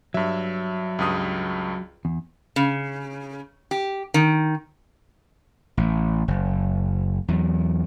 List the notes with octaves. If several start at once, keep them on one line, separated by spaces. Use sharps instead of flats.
G2 F#3 E5
C#2 G2 D#6
E2
C#3
G4
D#3
A1
F#1
E2 F#3